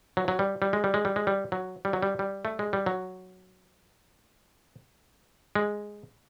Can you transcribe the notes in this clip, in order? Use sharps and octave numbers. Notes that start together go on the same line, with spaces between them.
F#3
F#3
G3
G3
G#3
G3
G#3
G3
G#3
G3
F#3
G3
F#3
G3
G3
A3
G#3
G3
F#3
G#3